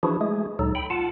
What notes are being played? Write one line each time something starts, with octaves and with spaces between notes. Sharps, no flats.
E3 F3 D4 E4 F#4 G#4
G#3 A3 G#4
D2 A#2 F#3 D#4 A4
G5 B5
F4 F#5 A5